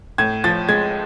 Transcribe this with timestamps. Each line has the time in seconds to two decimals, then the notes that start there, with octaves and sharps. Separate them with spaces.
0.18 A2 G#6
0.44 F3 A6
0.69 G#3 G#6